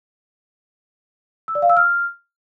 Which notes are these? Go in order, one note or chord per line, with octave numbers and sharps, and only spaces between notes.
E6
D5
F5
E6
F6